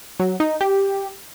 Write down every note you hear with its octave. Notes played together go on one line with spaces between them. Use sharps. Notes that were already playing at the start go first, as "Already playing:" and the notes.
F#3
D#4
G4